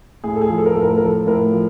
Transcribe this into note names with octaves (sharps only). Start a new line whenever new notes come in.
A2 G#4
A4
G#4
F3
A4
A#4
A2 A4
A#4
A4
A#4
F3 A4
A2 A#4
F3